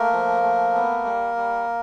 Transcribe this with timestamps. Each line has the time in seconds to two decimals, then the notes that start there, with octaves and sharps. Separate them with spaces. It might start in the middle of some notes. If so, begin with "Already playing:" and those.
Already playing: A3 A#3 A#4
0.12 F3
0.43 A3
0.74 B3
1.05 G3
1.36 G3